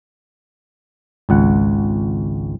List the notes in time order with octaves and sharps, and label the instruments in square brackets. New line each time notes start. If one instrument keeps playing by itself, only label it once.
[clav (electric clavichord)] G#1 C#2 F#5